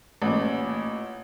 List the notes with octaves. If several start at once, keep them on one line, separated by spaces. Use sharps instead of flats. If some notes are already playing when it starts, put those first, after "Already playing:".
A1 A#2